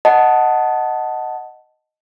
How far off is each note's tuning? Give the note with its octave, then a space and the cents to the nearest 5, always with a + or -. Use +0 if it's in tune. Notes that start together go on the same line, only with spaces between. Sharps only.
D#5 +0 F#5 +0 A5 +0